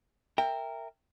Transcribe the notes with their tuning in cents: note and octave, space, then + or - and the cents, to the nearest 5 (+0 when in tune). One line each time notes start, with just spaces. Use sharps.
A#4 -15 E5 +0 G5 +15